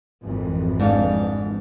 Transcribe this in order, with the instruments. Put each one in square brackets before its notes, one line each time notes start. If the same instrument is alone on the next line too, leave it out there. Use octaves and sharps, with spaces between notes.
[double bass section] G#1 F2 E3
[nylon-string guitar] G#2 D4 F5